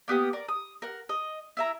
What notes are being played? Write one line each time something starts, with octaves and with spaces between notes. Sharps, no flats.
A#3 B3 G4 D#6
A#4 D5
D#6
A#4 F#5
D#5
E4 E5 A#5